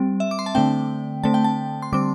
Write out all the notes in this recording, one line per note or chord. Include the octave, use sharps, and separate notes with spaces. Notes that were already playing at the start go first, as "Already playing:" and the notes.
Already playing: G3 C4
E5
D6
C6
A5
D3 A3 C4 G5
D3 A3 C4 A5
G5
A5
C6
D3 G3 C4 D6